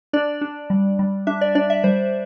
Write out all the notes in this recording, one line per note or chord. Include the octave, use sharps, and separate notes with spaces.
D4 D5
D4
G3
G3
D4 E5
D5
D4 D5
E5
G3 C5